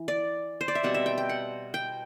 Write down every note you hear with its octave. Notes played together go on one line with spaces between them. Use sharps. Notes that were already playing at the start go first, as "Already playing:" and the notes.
Already playing: E3
D5
C5
D5
E5
B2 G3 C4 F#5
E5
G5
G5
F#5
G5